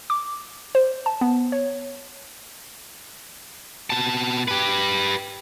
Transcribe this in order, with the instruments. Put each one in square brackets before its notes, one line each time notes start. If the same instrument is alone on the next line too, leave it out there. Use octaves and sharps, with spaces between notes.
[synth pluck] D6
C5
A5
B3
C#5
[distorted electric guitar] B2 A5
G4 B4